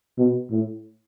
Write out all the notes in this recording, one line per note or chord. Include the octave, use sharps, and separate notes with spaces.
B2
A2